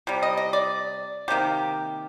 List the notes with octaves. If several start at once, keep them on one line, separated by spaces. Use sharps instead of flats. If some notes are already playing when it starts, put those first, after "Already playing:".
C3 G3
D#5
D#5
D5
C3 D#3 A#3 G4